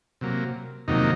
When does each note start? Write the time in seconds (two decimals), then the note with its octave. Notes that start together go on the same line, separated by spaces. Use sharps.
0.21 C3 F#3 A#3
0.88 F2 C3 D#3 F#3 A#3 D#4